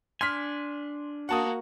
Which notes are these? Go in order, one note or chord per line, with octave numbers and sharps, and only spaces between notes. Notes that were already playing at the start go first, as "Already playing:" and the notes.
D4 G#5 C6 F6 B6
A#3 F#4 F#5 A5 D#6